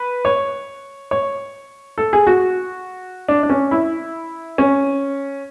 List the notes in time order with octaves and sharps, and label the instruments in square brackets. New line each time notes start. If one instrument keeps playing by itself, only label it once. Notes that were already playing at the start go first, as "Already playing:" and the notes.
Already playing: [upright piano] B4
C#5
C#5
A4
G#4
F#4
D4
D4
C#4
E4
C#4